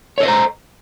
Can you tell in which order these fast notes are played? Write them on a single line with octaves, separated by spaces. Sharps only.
C#5 A4 D#5 C5 A#5